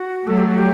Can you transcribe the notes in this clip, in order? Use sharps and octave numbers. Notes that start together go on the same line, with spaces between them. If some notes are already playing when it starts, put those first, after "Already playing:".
Already playing: F#4
F#3 A3 A4
G4
F#4
G4